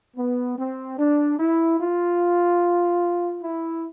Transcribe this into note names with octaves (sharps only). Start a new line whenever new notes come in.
B3
C4
D4
E4
F4
E4